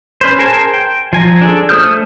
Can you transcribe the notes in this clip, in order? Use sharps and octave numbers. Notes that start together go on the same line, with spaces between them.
C#4 B4 C5
G#4 A#4 C5 G#5 A5
G5
F3 G#5 A#5
D4 G#4 A4
A3 C5 D#6 F6 G6